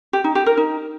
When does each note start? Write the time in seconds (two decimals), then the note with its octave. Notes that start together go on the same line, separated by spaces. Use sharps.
0.13 G4
0.24 D#4
0.35 G4
0.46 A#4
0.57 D#4